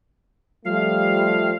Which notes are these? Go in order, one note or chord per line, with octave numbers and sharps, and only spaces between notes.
F3 G3 A3 F5